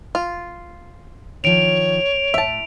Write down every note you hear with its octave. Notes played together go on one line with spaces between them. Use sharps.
F4
D#3 F3 C#5 D7 F7
A2 E5 A5